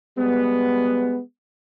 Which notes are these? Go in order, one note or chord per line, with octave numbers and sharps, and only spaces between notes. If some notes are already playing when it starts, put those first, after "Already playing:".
G3 G#3 B3